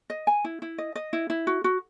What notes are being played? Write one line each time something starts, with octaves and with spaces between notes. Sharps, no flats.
D#5
G#5
E4
E4
D#5
D#5
E4
E4
F#4
F#4